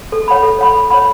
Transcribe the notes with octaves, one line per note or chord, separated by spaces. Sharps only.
A4
C#5 F#5 B5
A4
C#5 F#5 B5
A4
C#5 F#5 B5